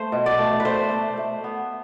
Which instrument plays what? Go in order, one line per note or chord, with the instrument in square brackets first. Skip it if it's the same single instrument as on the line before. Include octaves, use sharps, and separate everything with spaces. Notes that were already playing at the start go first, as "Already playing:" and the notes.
Already playing: [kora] A3 C5
B2
D5
A3
B4
A3 C5
A3
A3
B3